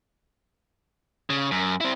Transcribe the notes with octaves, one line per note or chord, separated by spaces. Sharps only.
C#3
F#2
C4 E4